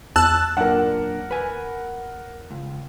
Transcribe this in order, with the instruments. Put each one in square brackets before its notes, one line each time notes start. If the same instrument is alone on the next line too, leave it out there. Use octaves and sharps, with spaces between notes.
[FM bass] E2 [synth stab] A5 E6 F#6
[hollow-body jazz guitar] F#2 A#2 D4 [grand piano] A#4 F#5
[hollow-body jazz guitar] B4 G#5
C#2